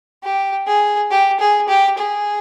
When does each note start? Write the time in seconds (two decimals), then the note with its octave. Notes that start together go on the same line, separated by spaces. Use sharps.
0.23 G4
0.67 G#4
1.11 G4
1.40 G#4
1.68 G4
1.97 G#4